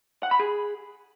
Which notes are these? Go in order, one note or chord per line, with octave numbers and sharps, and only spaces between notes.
F#5
B5
G#4